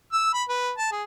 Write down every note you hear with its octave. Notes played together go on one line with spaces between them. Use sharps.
E6
B5
B4
A5
G#4